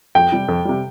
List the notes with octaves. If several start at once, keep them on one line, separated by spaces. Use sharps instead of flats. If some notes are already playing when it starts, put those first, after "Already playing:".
F2 G5
C3 G3
F2
C3 G3